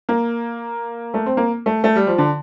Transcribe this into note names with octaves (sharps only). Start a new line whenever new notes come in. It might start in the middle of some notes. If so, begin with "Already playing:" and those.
A#3
A3
C4
A#3
A3
A3
G3
F3
D3